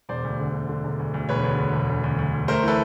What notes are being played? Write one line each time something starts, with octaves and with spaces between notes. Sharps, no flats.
E1 C5 D5
D2
D3
D2
D3
E1
D2
D2
E1 B4 C#5
D2
D3
E1
D2
D2
D2
D2
A3 A#4 C5
E3 A4 B4